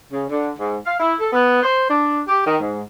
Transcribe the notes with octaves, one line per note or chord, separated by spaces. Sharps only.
C#3
D3
G#2
F5
E4
A4
B3
C5
D4
G4
D#3
G#2